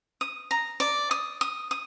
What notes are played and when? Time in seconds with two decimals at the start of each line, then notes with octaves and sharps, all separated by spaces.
0.21 D#6
0.51 A#5
0.80 D5
1.11 D#6
1.41 D#6
1.71 D#6